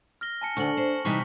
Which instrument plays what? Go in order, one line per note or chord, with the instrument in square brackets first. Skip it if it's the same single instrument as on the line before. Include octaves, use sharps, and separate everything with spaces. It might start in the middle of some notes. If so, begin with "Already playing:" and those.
[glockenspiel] F6 A#6 G7
G#5 A5 C#7
[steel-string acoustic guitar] D2 [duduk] D4 [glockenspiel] C#6 F#7
[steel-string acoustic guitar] C5
[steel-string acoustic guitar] C3 E3 G3 [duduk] D#4 [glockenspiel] C#6 B6